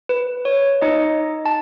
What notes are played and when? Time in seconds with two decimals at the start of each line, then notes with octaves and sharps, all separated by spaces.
0.09 B4
0.45 C#5
0.81 D#4 D#5
1.46 A5